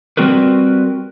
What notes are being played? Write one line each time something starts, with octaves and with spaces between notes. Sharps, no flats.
G3 C4 F#4 A#4 B4